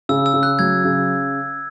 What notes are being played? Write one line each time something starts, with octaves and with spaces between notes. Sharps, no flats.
C#3 E6
E6
C#3
F#6
F#3 G#6
C#3